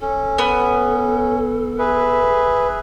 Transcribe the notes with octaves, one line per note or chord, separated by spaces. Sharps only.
C#4 A4
B3
G#4 B4 E5